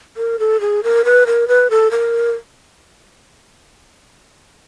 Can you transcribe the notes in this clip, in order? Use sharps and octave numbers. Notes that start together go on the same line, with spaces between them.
A#4
A4
G#4
A#4
B4
A#4
B4
A4
A#4